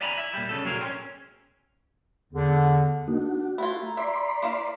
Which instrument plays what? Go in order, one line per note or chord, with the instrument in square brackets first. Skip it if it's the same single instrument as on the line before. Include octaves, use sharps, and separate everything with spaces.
[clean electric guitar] D5 E5 G#5 A#5 B5
E4 E5
A#2 G3
B1 C#3 A3 A4
A#2 F#3 G#4 A#4
C4 C#4
[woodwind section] E2 D3
[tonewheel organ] A#3 D#4 F#4 [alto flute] D4
[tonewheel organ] F#4
[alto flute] A3 [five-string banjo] E4 F4
[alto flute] A#5
[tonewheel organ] D5 B5 C6 [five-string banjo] E5
[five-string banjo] A#3 E4 F5